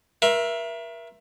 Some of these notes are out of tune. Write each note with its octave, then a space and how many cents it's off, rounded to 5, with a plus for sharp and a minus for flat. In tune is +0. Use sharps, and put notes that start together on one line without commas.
A#4 +35 E5 +20 C6 +30